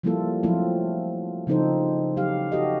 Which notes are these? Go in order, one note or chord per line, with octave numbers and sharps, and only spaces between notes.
F3 G3 A#3 E4 F4 A4
F3 F#3 A3 C4 E4 F4
C#3 F3 C4 D#4 A4 C5
F#3 G4 F5
F#4 G4 A4 D#5